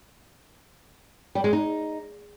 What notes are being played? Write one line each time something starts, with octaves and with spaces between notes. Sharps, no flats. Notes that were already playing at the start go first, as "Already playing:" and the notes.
G3
G#3
D#4